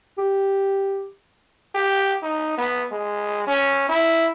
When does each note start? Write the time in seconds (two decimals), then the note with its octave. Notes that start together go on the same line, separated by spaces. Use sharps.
0.18 G4
1.75 G4
2.23 D#4
2.58 B3
2.92 G#3
3.47 C#4
3.89 E4